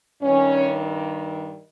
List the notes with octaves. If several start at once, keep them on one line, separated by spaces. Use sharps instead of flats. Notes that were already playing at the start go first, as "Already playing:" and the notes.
G2 D#3 C#4